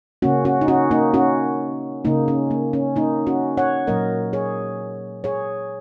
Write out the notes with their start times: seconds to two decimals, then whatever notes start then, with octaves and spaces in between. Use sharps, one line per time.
0.22 C#3 A#3 C#4 F#4
0.45 C#4 F#4
0.61 D#4
0.68 C#4 F#4
0.91 A#3 D#4
1.14 C#4 F#4
2.05 C#3 A#3 D#4
2.28 C#4
2.51 A#3
2.73 C#4
2.96 A#3 D#4
3.27 C#4 F#4
3.57 C#5 F#5
3.87 A#2 F#3 A#3 A#4 D#5
4.33 G#4 C#5
5.24 G#4 C#5